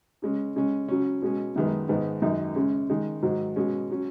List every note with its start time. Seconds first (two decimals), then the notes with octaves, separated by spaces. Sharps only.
0.22 C#3 G#3 C#4
0.56 C#3 G#3 C#4
0.88 C#3 F#3 C#4
1.22 B2 G#3 C#4
1.56 F#2 D#3 G#3 B3
1.89 G#2 D#3 G#3 B3
2.22 F#2 D#3 G#3 D#4
2.55 C#3 G#3 C#4
2.90 D#3 G#3 D#4
3.23 G#2 D#3 F#3
3.56 B2 G#3 C#4
3.91 F#3 C#4